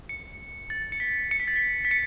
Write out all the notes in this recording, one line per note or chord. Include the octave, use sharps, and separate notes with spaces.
C#7
A6
C#7
B6
C#7
B6
A6
B6
B6
C#7